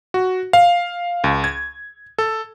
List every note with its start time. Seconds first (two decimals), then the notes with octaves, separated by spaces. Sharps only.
0.14 F#4
0.53 F5
1.24 C#2
1.44 G#6
2.18 A4